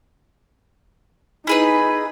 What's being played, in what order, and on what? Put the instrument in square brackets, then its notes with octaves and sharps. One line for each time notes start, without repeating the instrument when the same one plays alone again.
[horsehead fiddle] D#4 [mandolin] E4 G#4 B4